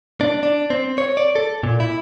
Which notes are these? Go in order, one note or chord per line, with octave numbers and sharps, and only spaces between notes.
D4
D4
C4
C#5
D5
A4
A#2
E4